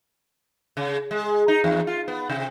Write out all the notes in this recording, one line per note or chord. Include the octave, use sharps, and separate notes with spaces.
C#3
G#3
D#4
E2
F4
B3
C3